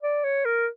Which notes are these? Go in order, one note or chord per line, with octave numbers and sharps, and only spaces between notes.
D5
C#5
A#4